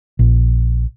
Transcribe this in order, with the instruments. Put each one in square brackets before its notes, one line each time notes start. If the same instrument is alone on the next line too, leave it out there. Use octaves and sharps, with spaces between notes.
[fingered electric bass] A#1